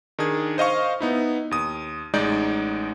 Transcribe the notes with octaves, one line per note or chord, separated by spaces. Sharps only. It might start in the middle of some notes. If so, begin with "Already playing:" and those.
D#3 D4 G#4 G#6
C5 D#5 F5 C#6
B3 D#4 E4
D#2 D#6
A1 G#3 D#4 D5 G6